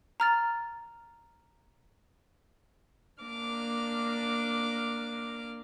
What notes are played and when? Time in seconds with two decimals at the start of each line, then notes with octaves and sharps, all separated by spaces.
0.20 A#5 F6 A6
3.22 A#3 D4 D6 F6